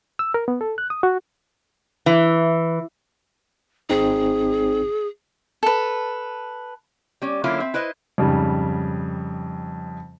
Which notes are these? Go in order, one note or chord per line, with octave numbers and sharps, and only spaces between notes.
E6
A#4
B3
A4
F#6
D#6
F#4
E3
G#1 C4 D#4 G#4
A4 B4
G3 C#4
D3 F#3 A#3 C#4 E4 F4
C4 E5
E4 B4 C5 D#5
F2 G#2 C#3 G3